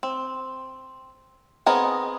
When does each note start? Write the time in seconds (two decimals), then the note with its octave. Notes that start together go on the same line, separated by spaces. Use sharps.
0.03 C4
1.66 B3 C4 G#4 A#4 D#5